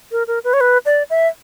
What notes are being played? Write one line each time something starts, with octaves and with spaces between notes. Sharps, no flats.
A#4
A#4
B4
C#5
B4
D5
E5